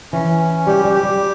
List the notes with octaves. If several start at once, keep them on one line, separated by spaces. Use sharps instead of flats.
E3 C#4
C#4
G3 G4
G3
G4
G3